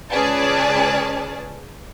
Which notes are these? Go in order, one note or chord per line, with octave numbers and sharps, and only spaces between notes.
C#2 C#4 G#4 B4 D5 A5